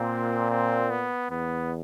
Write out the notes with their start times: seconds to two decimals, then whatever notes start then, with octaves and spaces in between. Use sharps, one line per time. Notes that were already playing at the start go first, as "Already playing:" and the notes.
Already playing: A#2 C4
0.50 C4
0.90 B3
1.30 E2 B3